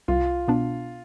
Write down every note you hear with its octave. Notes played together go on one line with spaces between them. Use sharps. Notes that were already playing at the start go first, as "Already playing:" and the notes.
C2 F4
B2 B3 D4